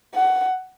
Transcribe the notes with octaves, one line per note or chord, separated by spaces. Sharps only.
F#5